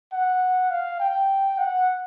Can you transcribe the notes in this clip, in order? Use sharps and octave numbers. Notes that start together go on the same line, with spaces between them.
F#5
F5
G5
F#5